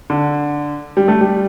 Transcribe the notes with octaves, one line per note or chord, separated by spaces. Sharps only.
D3
G3
A3
G3